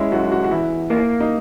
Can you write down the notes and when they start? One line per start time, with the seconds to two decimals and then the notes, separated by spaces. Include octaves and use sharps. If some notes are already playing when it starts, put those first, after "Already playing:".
Already playing: G#3 C#4 E4
0.12 F#2 F#4
0.32 F#4
0.44 F#4
0.51 E2 E4
0.90 A#3
1.20 D#4